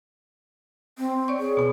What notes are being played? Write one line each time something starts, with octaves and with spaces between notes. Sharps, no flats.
C4
C#5 D5 C#6
G#4
B2 B3